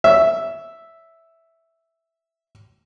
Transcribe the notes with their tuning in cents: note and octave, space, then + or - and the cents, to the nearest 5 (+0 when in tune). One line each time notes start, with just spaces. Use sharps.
C#5 +30 E5 +0